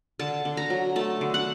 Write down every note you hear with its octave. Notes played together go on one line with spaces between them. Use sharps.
D3 A5
D3
A#5
F#3
A3 A5
D3
F#5